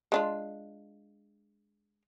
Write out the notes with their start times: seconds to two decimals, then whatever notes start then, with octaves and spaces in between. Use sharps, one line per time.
0.12 G#3 D4 F4